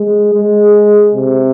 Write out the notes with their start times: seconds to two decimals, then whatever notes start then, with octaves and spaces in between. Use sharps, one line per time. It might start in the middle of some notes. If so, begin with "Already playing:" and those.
Already playing: G#3
0.34 G#3
1.14 C3